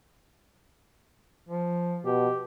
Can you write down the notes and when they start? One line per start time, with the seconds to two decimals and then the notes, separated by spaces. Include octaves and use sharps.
1.49 F3
2.05 B2 G4